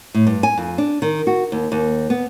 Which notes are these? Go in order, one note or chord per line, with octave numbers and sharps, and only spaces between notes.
A2
G2
G#5
F2
D4
D#3
F#4
D#2
D#2
B3